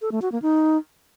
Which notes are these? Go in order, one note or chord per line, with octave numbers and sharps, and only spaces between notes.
A4
A3
F#4
A#3
D#4